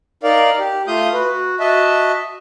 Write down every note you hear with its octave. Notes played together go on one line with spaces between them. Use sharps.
D#4 A#4 D5 F5
G4
A3 F4 F5 D#6 G6
F#4 B4
F#4
F#4 D#5 E5 A5